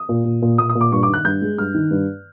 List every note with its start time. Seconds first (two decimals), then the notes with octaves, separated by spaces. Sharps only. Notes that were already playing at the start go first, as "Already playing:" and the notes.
Already playing: D#6
0.09 A#2
0.25 A#2
0.42 A#2
0.58 A#2 D#6
0.69 D#6
0.75 A#2
0.81 D6
0.92 G2 C#6
1.03 D6
1.08 D#3
1.14 F#6
1.24 G2 G6
1.42 G#3
1.58 G2 F6
1.74 D#3
1.91 G2